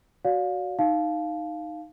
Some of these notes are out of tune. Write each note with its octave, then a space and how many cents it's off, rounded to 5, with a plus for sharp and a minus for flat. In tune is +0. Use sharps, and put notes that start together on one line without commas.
F#4 +0 D5 -45 F5 +25
D#4 +0 F5 +0 A5 -25